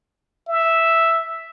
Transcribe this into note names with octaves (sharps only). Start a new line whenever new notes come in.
E5